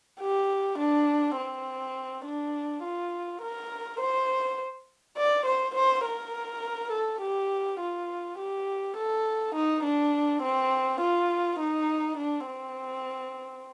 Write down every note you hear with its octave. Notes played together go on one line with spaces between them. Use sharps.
G4
D4
C4
D4
F4
A#4
C5
D5
C5
C5
A#4
A4
G4
F4
G4
A4
D#4
D4
C4
F4
D#4
D4
C4